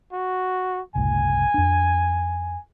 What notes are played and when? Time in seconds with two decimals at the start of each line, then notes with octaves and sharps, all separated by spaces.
0.13 F#4
0.95 F#1 C2 A2 G#5
1.54 F2 D4